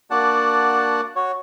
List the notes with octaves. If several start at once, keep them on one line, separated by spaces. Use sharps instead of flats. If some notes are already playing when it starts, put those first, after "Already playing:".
A#3 D4 F#4 D5 F#5 A5
F#4 C#5